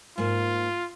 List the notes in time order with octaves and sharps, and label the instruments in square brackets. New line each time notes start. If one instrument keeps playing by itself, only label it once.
[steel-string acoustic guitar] G#2 A#3 [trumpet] F4